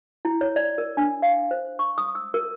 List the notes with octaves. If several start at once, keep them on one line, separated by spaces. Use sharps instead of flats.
E4
C#5
D5
A#4
D4
F5
C5
C#6
D#6
E6
A#4